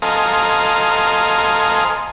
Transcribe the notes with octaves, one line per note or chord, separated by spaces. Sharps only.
A4 C5 D#5 F5 G#5 A#5